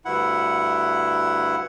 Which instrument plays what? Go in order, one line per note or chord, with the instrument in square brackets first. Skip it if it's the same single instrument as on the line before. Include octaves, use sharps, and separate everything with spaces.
[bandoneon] D2 G2 E4 F#5